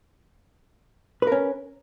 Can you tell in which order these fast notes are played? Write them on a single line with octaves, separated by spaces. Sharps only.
B4 A#4 C#4